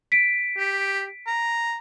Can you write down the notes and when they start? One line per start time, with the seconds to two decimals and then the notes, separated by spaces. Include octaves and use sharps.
0.12 B6 D7
0.58 G4
1.27 A#5